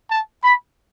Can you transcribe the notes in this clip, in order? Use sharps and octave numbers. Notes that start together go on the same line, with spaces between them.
A5
B5